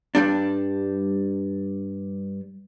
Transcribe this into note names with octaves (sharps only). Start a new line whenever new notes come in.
G2 G3 D4